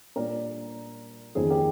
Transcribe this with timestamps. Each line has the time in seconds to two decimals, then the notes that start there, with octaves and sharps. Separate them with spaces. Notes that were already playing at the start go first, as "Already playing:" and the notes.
0.16 A#2 G3 D4 A#4 D5
1.35 F2 D#3 A#3 G#4 C5
1.50 G4 A#4